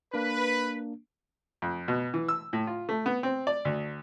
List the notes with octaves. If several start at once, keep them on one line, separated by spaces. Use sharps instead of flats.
A#3 D4 B4
F2
B2
E3
E6
A2
F4
A3
B3
C4
D5
D2